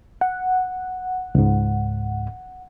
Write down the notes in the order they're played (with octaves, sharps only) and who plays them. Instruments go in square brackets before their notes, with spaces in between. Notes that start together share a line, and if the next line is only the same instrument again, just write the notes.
[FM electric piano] F#5
[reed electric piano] C#2 G#2